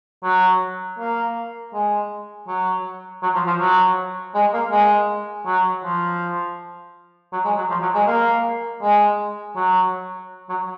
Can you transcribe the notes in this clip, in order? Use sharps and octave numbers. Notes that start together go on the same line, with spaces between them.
F#3
A#3
G#3
F#3
F#3
F3
F3
F#3
G#3
A#3
G#3
F#3
F3
F#3
G#3
F#3
F3
F#3
G#3
A#3
G#3
F#3
F#3